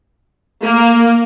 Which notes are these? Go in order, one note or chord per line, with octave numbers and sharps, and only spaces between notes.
A#3